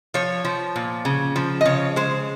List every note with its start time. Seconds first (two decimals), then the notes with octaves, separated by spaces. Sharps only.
0.14 F3 C#5
0.45 F3
0.76 A#2
1.05 C#3
1.36 F3
1.61 D#5
1.65 C#3 C#5
1.96 G#3 C5